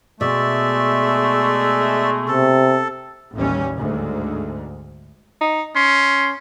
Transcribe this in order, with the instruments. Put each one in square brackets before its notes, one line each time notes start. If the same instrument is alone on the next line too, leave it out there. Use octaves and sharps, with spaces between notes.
[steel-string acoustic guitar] B2 [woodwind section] G#3 A3 [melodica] D5 E5
[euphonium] C3 [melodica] A4
[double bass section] A1 D#2 E3 G3 C#4
D2 G#2
[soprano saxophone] D#4
[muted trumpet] C#4 [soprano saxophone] C6